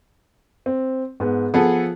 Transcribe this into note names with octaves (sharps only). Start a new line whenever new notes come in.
C4
G#2 B3
F3 B3 G#4 A4